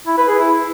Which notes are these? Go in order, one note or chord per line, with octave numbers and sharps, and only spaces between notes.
E4
B4
G#4
E4